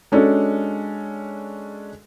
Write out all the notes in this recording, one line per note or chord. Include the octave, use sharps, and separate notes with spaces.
G#3 C#4 D4 F#4 A4